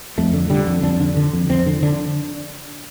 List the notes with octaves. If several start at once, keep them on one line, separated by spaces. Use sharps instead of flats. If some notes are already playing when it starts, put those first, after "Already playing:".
F2 A3
D3
D3 G3
F2
F2 D4
D3
D3
F2
F2 C4
D3
D3 D4